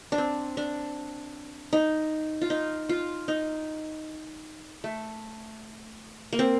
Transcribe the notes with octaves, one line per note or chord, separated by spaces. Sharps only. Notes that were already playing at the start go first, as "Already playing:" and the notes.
D4
C4
D4
D#4
F4
D#4
F4
D#4
A3
A#3
C4